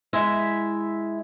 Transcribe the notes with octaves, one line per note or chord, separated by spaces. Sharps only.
G#3 E4 E5